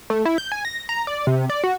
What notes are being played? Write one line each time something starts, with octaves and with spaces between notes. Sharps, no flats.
A3
E4
G6
G#5
A#6
A#5
D5
C3
D5
F#4